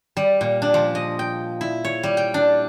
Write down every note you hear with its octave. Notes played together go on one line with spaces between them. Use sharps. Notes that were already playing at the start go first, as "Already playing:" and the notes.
G3
A#2
D4
F3
D#5
G5
E4
C#5
G3
G5
D4